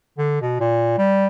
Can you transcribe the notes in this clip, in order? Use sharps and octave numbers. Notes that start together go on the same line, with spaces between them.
D3
B2
A#2
G3